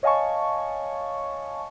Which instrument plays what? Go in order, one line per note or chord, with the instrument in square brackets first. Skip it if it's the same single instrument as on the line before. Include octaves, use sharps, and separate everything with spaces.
[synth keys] C#5 D#5 F5 G#5 A5 C#6